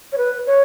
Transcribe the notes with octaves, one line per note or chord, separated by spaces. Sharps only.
C#5
B4
C#5